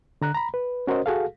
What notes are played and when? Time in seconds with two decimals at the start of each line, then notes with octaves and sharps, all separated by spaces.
0.22 D3 A#5 F#6
0.34 A#5 B5
0.54 B4
0.87 C#4 F#4 A#4 C5 D#5
1.06 F#4 G#4 A4 F5